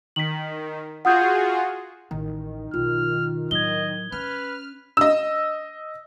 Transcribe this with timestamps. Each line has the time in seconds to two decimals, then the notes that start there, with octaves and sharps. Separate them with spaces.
0.16 D#3 B6 F#7
1.05 F4 F#4 G#4 F#5 D#6 G6
2.11 A1 D#3
2.74 B1 F4 F6
3.51 A2 F#3 D#5 G#6 G7
4.12 C#4 B4 F6
4.97 D#5 E6